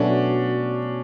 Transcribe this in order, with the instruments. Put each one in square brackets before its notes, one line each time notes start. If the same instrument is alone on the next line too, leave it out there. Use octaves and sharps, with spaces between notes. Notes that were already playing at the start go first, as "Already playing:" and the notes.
Already playing: [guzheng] B2 F#3 A3 [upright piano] C#4 D4